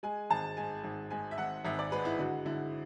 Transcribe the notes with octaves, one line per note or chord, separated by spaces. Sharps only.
G#3 G#5
G#1 A5
G#2 G#5
G#1
G#2 G#5
E5
G#1 F#5
G#1 E5
D5
G#3 B4
E4
D3 F#4
D3 E4